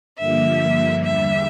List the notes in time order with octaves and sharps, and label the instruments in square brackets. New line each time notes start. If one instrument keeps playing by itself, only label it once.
[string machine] G2 D3 F3 A#3 [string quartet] E5
[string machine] E2 D3 G3 [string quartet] E5